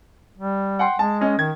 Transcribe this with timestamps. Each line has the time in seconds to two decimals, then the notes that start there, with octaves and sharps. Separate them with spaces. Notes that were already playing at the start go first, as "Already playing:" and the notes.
0.37 G3
0.79 F#5 G5 C6
0.99 G#3 A5
1.21 C#4 D#5
1.39 D#3 G#6